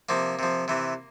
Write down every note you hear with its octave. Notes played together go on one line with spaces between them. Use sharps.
C3 F3 A#3
C3 F3
C3 E3